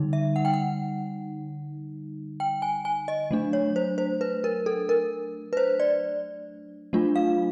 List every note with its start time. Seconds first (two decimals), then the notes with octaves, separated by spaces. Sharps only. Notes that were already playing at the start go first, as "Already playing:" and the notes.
Already playing: D3 G3 D#4
0.13 E5
0.36 F#5
0.45 G5
0.53 F#5
2.40 G5
2.62 G#5
2.85 G#5
3.08 D#5
3.31 F#3 A3 D4
3.53 C#5
3.76 C5
3.98 C5
4.21 B4
4.44 A#4
4.66 A4
4.89 A#4
5.53 B4
5.57 C5
5.80 D5
6.93 F#3 A3 D4 F4
7.16 F5